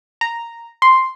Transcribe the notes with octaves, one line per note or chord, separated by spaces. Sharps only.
A#5
C6